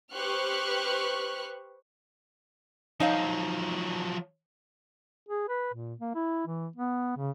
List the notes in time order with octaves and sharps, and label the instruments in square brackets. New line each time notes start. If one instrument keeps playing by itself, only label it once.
[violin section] G4 B4 C5 C#6 F6 F#6
[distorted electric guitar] F3 F#3 [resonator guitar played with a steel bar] D#4 C#5 F5
[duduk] G#4
B4
A#2
A#3
E4
E3
B3
C#3